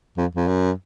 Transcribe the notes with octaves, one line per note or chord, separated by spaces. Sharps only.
F2
F2
F#2